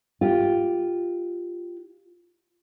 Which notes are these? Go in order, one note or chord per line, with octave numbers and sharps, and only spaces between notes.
F4 G4